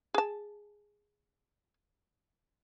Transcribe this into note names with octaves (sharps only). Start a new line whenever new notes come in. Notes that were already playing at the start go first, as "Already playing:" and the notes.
G#4 A5